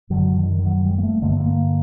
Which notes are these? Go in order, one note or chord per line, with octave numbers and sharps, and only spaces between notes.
F#2 D3 F#3
D3
D#3
D#3
F#3
G3
A#3
A3
G2 D3 A#3
A3
A#3